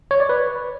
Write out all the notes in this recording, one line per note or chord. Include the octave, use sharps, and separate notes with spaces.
C#5
D5
B4